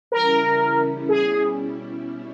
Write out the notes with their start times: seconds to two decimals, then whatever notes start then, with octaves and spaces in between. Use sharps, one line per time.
0.11 C#3 E3 G3 C#4 E4 A#4
1.08 B2 G3 C#4 E4 G#4